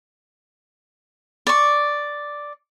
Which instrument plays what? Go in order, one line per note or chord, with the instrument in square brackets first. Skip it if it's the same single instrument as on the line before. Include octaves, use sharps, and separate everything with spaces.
[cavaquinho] D5 C#6